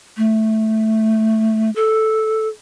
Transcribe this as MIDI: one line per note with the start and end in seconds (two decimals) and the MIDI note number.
0.17 1.70 57
1.76 2.48 69